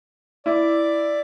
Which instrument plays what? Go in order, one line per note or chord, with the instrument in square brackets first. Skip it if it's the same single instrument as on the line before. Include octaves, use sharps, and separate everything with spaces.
[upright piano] E4 [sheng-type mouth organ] D5